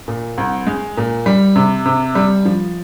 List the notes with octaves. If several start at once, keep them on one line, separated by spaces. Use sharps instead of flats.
A#2
C2
G#3
A#2
G3
C3
C3
G3
F3